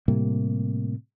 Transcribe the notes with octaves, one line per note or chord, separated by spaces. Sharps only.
A2 C3 G3 A#3